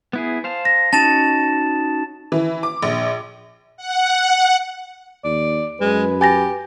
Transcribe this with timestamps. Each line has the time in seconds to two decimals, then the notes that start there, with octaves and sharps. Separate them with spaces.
0.13 B3 E4 G#4
0.44 C5 F5 A5
0.65 A#6
0.93 C#4 D#4 F#4 A5 A6 E7
2.32 E3
2.63 D6
2.83 A#1
3.77 F#5
5.24 D#2 D5
5.81 F#2 G#3 B4
6.21 G4 G#5 A6 A#6